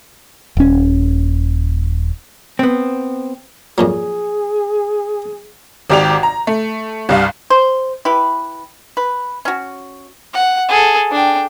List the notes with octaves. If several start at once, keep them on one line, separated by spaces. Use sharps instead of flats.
D#1 C#4
B3 C4
F2 A#2 F#3 G#4
G#1 G#2 G4 D5 F7
A#5
A3
C2 G2 F5
C5
E4 G4 B4
B4
C#4 F#4
F#5
G#4 A4
D4 G5